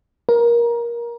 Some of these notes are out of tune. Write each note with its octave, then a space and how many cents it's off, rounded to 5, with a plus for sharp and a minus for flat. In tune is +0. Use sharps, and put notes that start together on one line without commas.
A#4 +20